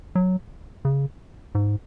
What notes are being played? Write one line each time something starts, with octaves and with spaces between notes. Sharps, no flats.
F#3
C#3
G#2